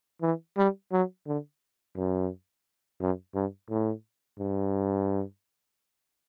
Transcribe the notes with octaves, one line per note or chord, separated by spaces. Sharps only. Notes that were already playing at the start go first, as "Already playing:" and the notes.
E3
G3
F#3
D3
F#2
F#2
G2
A2
G2